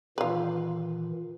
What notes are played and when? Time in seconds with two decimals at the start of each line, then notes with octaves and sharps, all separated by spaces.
0.18 A#2 D#3 E3 F4 B4